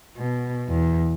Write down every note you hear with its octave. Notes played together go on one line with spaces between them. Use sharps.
B2
E2